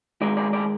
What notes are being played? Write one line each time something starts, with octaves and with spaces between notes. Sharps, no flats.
G#2 D#3 G#3 D5
D5
D5